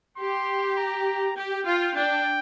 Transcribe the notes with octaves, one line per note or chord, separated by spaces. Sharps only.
G4 C6
A#5
G4 G5
F4
D4 G5